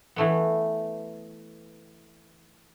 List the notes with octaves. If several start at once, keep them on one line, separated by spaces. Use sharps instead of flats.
E3 A3 B3